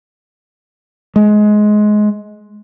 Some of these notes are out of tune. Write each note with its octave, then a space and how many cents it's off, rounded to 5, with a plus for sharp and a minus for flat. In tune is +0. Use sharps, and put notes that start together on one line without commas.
G#3 +20